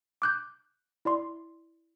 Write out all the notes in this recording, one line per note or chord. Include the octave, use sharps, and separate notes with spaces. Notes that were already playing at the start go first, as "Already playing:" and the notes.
D6 F#6 G6
E4 D5 C6